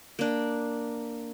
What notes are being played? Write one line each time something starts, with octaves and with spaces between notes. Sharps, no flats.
A#3 D4